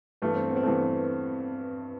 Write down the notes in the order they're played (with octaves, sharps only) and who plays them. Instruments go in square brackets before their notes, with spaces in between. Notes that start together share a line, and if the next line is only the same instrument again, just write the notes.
[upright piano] G2 E3 A3 [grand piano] B3
[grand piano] C4
B3
C4
[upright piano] G2 E3 A3 [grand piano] B3